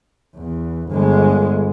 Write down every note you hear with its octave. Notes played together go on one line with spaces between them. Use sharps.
E2
G1 G#3